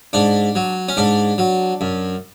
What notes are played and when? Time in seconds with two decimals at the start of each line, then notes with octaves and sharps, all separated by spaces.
0.13 G#2 D4
0.55 F#3
0.89 C#4
0.97 G#2 D4
1.38 F#3
1.81 F#2